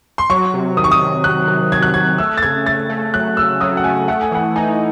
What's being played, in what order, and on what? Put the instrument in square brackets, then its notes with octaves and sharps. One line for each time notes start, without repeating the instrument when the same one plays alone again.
[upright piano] C6
[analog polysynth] F#3 [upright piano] C#6
[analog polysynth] C3
[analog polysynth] D#3 [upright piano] D#6
[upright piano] C#6
D#6
[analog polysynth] C3
[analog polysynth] C3 [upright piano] F#6
[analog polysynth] C3
[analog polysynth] F#3 [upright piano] G#6
[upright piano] F#6
[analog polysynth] C3 [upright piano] G#6
[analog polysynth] A3 [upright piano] E6
[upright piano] A6
[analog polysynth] C#3 [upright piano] G#6
[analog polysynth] A3 [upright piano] A6
[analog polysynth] A3
[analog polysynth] F#3 [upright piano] F#6
[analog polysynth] C#3 [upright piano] E6
[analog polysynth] F#3 [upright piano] D#6
[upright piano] F#5
[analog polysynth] A3 [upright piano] G#5
[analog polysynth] A3 [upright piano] F#5
[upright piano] G#5
[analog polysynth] E3 [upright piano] F#5
[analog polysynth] D#4 [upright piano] G#5